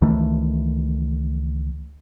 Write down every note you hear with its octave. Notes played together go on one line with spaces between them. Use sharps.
C#2 D#3 E3 A3